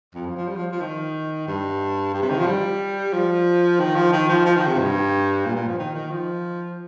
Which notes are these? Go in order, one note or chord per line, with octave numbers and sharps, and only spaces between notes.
F2
F3
F3
G3
F3
F3
D#3
G2
G2
C3
D#3
F3
G3
F3
D#3
F3
D#3
F3
F3
D#3
C3
G2
A#2
A#2
F3
D#3
D#3
F3